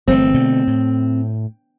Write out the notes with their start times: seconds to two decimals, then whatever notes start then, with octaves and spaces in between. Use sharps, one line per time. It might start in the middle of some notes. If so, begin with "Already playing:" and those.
0.08 G1 E3 A3 C4
0.34 B2 D3 A3
0.67 A2